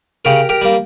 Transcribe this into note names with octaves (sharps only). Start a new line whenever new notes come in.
C#3 G4 A#4
G4 A#4
G3 A#3